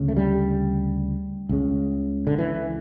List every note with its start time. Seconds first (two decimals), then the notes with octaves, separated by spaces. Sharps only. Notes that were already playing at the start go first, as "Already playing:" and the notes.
Already playing: D2 C#3
0.08 A3
0.17 G3
1.49 C#2 C#3
2.27 D3
2.38 E3